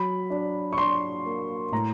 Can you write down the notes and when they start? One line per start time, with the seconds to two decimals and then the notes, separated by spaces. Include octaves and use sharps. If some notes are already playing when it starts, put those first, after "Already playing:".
Already playing: F#3 B5
0.30 D4
0.73 C#6
0.77 D4 C6
1.25 A#3
1.72 A2 A#5